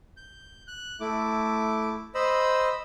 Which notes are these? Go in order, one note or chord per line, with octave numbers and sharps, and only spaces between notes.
G6
F#6
A3 E4 D6
C5 D#5 B5 E6